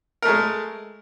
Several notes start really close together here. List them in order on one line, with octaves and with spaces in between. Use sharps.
A#4 A3 G#3